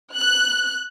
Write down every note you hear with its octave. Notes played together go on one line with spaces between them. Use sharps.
F#6